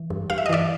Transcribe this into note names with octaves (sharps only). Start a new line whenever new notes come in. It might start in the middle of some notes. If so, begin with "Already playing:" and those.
Already playing: E3
G2
G2 F5
E5
D#5
E3 D5 E5